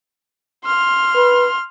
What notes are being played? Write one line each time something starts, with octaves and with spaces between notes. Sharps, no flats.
C6 F6
B4